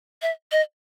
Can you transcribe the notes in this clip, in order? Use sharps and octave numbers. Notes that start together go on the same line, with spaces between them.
E5
D#5